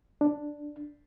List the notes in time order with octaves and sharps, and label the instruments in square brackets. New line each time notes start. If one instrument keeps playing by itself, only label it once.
[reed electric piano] D4